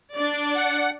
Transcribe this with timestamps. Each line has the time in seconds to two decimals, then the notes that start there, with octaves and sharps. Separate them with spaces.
0.15 D4 D5
0.56 F#5